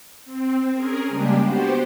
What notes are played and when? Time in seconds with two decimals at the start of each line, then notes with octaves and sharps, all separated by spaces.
0.25 C4
0.74 C#4 G#4 A#4
1.09 C#3 G3 G#3 A#3 D4 G4
1.43 B3 F#4 G4 C5